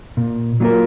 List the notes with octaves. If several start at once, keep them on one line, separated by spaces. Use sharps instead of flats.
A#2
F#3 A#3 F4 A#4